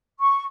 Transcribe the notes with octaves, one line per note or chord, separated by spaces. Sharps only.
C#6